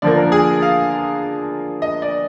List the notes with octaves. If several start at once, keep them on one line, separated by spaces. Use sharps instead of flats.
D3 F3 A#3 D5
A#4
G#4
F5
D#5
D5